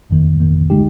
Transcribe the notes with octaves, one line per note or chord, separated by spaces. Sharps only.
G1 F2 D#3 A#3
G1 F2 D#3 A#3
D3 G#3 D#4 G4